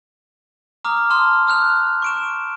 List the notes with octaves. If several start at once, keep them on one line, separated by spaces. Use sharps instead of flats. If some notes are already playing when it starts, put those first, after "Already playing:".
A#5 D6 D#6 F6
A5 C6 D#6 F6
D#6 F6 F#6 F7
C#6 D7 E7